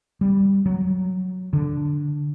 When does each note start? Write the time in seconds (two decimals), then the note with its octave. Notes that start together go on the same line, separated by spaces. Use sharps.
0.21 G3
0.66 F#3
1.53 D3